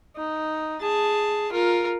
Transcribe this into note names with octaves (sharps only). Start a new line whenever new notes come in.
D#4
G#4 A5
F4 A#4